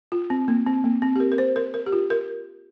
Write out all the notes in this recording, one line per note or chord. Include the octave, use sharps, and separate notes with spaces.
F4
C4
A#3
C4
A#3
C4
G4
A#4
A#4
C5
A#4
A#4
G4
F4
A#4